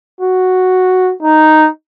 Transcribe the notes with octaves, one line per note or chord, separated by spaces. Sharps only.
F#4
D#4